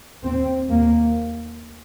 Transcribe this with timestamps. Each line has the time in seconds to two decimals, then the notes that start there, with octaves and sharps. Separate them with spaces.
0.23 D#2 C4
0.69 D#2 A#3